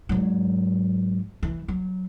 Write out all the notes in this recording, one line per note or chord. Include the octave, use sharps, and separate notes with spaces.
G#2 F#3
E3
F#3